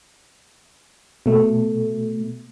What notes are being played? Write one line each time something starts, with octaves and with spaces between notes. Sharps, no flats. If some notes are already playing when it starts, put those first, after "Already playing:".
B2 A3